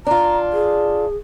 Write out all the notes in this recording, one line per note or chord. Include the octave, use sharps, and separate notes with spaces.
D4 F4 A#5
G#4